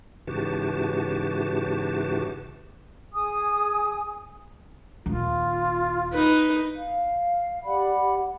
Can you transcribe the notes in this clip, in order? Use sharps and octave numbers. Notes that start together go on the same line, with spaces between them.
G#2 C#3 E3 F#4 G4 A5
G#4 G#5 D#6
D#1 D#2 F4
D#4 B4
F5
G4 D5 F#5 B5